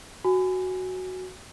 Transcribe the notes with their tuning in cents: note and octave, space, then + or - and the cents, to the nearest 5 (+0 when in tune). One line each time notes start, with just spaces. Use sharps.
F#4 +0 G#5 -5